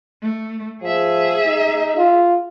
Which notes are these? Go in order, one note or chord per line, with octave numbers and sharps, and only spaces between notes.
A3
F3 G#4 E5
D#4
F4